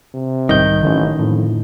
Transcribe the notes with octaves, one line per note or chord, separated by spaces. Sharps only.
C3
B1 G#2 D#3 G3 D#5 G6
A1 D3 F#3 C#4
F2 A2